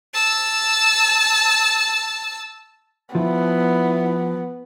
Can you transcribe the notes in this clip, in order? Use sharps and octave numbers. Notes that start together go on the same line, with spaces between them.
A5 E6
F3 B3 E4